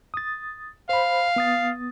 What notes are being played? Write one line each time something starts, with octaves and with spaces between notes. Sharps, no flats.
D#6 A6
C5 F5 B5
B3 D#6 A6